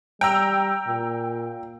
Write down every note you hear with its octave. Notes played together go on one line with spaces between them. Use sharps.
G3 G5 A#5 E6
A#2